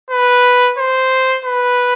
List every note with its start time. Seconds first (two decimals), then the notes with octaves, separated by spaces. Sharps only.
0.10 B4
0.78 C5
1.45 B4